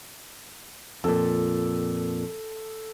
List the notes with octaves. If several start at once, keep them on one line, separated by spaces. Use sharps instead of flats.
F2 A#2 A4